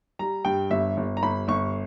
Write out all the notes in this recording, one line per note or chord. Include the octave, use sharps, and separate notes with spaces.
G3 A#5
G2 G5
G1 E5
G1
A#5
G1 B5
G1 C#6